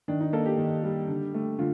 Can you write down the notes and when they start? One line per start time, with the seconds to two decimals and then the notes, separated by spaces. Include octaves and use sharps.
0.08 D#3 D4
0.21 D#4
0.33 A#3 A4
0.46 G4
0.58 D#3
0.84 G3
1.08 D3
1.34 A3
1.59 D3 F4